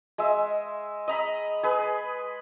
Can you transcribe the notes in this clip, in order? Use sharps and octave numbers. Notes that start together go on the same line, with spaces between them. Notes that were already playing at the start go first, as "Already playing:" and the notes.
G#3 E5
D#5 A#5 B5
G#4 B4